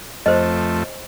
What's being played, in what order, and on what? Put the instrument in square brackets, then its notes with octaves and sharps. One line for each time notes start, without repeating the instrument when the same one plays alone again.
[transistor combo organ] F2 A3 [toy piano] C5 D#5